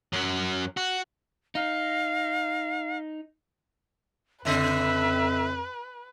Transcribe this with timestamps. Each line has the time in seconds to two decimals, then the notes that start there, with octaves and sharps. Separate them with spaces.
0.13 F#2 F#3
0.77 F#4
1.55 D#4 F5
4.45 F2 A2 C#3 B4 D#5 E5